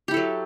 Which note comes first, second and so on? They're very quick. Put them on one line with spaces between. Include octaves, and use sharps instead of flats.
G4 E4 A4 F#3